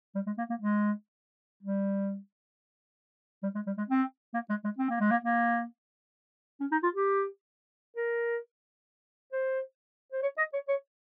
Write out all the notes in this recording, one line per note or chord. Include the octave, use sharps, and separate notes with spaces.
G3
G#3
A#3
A#3
G#3
G3
G3
G#3
G3
G#3
C4
A#3
G#3
G#3
C4
A#3
G#3
A#3
A#3
C#4
D#4
F4
G4
A#4
C5
C5
C#5
D#5
C#5
C#5